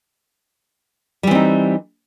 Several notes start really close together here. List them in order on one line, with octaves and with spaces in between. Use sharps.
G3 E3 C4 D#4